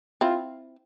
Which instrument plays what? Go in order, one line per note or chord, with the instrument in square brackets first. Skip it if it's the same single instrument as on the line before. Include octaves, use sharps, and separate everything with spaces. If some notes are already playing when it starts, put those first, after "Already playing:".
[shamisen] C4 E4 [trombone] F4